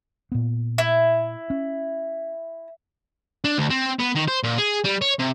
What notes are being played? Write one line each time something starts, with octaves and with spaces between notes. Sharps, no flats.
A#2 B3
E4
C#4
D4
D2
C4
B3
D#3
C5
A#2
G#4
G3
C#5
C3